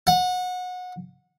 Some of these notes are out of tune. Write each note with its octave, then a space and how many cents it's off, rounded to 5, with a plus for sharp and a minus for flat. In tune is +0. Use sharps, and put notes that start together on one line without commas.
F#5 -25